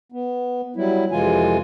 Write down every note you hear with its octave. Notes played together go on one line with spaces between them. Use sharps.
B3
F#3 G3 E4
F2 C3 E3 G#3 F4 G#5